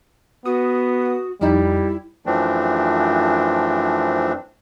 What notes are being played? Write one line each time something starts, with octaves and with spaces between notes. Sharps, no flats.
B3 F#4 D#6
F2 G3 D#4 E4
F#2 E3 F3 A3 C4 D4